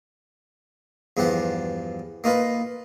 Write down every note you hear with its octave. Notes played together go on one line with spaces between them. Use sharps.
E2 G2 F3 G4 F#5
A#3 D#4 F4 B4